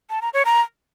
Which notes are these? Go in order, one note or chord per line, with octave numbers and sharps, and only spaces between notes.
A5
A#5
C#5
A#5